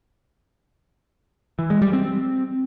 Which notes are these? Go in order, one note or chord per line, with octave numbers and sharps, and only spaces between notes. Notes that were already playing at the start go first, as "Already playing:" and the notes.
E3
G#3
G3
C4